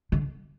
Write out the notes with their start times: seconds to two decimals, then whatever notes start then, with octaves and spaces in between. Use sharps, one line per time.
0.12 D3